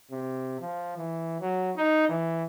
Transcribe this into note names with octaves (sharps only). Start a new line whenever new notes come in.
C3
F3
E3
F#3
D#4
E3